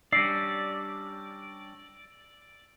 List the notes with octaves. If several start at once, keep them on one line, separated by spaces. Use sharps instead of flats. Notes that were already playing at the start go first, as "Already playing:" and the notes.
G3 C#4 D4 D5 E6 A#6 C7